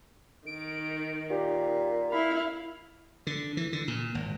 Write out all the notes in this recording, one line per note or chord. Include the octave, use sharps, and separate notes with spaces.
D#3 D7
A#2 G4
E4 F5 B5
D3
E3
D3
A#2
G#1